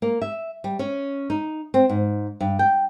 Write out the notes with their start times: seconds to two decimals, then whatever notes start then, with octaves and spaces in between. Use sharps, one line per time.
0.02 A#3
0.22 E5
0.64 G3
0.79 C#4
1.30 D#4
1.74 C4
1.89 G#2
2.40 G2
2.59 G5